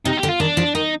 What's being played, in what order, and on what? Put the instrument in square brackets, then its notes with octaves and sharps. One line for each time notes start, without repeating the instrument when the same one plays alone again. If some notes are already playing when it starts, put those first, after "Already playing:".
[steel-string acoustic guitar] C3 [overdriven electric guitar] D#4
[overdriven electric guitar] G4
[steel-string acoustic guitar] D3
[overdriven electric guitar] F4
[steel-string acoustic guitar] D#3 [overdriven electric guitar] D4
[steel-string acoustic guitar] F3
[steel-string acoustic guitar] D#3 [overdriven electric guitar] D#4